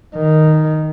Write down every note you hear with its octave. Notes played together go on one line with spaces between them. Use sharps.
D#3